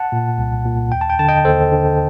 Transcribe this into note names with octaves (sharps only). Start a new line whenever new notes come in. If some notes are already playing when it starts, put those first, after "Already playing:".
Already playing: F#5 A5
A#2
C2
A#2
D#2 G5
A5
G5
D3 A5
D#5 G5
D#2 A4 C5
D3